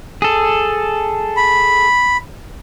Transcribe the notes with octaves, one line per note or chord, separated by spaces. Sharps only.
G#4 A4
B5